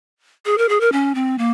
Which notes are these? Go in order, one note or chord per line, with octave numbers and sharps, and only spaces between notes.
G#4
A#4
G#4
A#4
C#4
C4
A#3